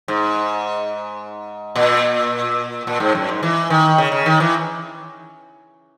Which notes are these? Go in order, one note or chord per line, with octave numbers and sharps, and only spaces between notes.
G#2
A#2
A#2
G#2
F#2
G#2
E3
D#3
C#3
C#3
D#3
E3